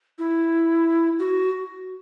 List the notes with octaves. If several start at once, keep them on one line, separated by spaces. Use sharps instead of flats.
E4
F#4